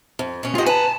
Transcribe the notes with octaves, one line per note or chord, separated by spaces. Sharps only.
F2
B2 C#4
F4 G4 G#4 D#5
B4 F#5 G#5 A5